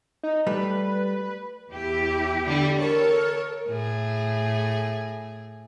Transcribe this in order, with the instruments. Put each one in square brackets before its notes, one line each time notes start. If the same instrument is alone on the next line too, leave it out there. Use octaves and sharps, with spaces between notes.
[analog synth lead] D#4
[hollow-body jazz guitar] G3 A3 [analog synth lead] B4
[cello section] E2 E4 G4
[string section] D3 G3
[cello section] A4 [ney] A#4 [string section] C#5
[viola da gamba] A2 G#4